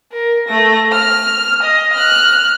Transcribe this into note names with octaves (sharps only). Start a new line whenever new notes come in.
A#4
A3 A#6
F6
D#5
F6 F#6